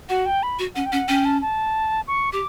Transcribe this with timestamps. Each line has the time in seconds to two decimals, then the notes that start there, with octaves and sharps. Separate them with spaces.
0.09 F#4 F#5
0.26 G5
0.43 B5
0.59 F#4
0.75 C#4 F#5
0.86 G5
0.92 C#4 F#5
1.08 C#4 G5
1.25 A5
1.42 A5
2.07 C#6
2.33 G4 D6